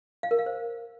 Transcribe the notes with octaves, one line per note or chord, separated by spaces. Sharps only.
F5
A#4
F5
C5